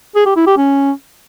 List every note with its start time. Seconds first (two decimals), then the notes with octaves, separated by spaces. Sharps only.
0.15 G#4
0.26 G4
0.36 E4
0.46 G4
0.57 C#4